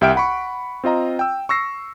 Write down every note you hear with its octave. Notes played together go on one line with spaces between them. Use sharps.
C2 G4 E5 G5 F6 D7
F#5 B5 C#6
C4 F4 D#5 A#5
G5 E6
C#6 E6 A#6 C7